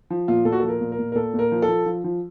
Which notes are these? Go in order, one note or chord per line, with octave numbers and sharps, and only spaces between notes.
F3
A#2 F4
A#2 A4
F#4
F3 A4
A#4
A#2
A#4
A#2
A#4
A#2 A4
A#2 A#4
F3
A4
F3
F3
F3